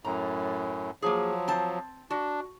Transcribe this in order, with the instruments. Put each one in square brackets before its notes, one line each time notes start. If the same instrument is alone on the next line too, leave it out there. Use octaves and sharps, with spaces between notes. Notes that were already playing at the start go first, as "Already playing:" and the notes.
[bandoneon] F#2 A2 [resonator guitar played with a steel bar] A#5
[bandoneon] F3 F#3 [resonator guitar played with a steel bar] A#3 G#4
[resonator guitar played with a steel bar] C4 A5
[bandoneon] D4 [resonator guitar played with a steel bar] F#4